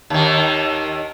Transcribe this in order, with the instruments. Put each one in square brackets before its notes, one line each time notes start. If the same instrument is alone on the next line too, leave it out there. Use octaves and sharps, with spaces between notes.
[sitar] D#2 D#3